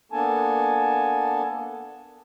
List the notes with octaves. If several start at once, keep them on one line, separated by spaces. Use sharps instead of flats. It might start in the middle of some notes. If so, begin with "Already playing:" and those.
A#3 B3 D4 A4 G#5 A5